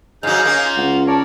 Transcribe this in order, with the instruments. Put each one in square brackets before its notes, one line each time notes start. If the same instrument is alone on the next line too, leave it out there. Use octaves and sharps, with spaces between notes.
[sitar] G#2 F#3 [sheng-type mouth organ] D#4 G#4 F5 [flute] G6
[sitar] A#3 C#4
[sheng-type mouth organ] F4
[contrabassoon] C#2 [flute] F#5
[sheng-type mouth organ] A#4 C#5 D5 [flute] A5